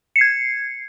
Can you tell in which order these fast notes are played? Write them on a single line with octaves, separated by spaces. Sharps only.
C#7 C7 G#6